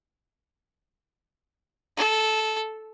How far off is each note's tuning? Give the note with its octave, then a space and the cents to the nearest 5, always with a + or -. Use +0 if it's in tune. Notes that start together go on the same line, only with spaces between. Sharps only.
A4 -10